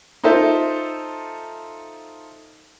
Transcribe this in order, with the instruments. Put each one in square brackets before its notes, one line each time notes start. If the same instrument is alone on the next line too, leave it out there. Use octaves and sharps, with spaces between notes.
[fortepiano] D#4 F4 A4 C5 E5